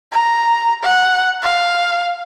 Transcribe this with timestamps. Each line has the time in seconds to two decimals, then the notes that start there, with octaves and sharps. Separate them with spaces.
0.12 A#5
0.83 F#5
1.43 F5